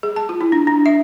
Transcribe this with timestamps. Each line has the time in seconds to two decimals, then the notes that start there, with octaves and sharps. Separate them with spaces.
0.03 G#4
0.16 A5
0.29 F4
0.41 E4
0.52 D4
0.67 D4
0.86 E5